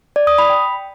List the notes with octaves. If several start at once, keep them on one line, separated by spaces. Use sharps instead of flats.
D5
D#6
B5
G5